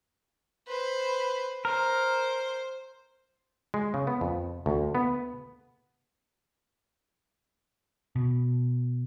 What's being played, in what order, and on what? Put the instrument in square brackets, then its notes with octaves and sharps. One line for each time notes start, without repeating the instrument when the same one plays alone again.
[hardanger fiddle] B4 C5
[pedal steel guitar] A#4 [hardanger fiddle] C5
[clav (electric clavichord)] G#3
C#3
B3
F2
D2
B3
[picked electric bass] B2